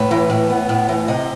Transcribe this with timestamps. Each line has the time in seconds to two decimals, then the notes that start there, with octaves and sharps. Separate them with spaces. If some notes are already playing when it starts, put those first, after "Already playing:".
Already playing: A2 B4
0.11 E3
0.30 A2
0.50 B3
0.69 A2
0.89 E3
1.08 C3 D#5